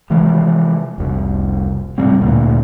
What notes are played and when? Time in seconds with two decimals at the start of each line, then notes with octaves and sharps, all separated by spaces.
0.10 C3 E3 F3 G#3
0.98 F1 C2
1.98 A2 C3 G3 C4
2.21 D2 A#2 A#3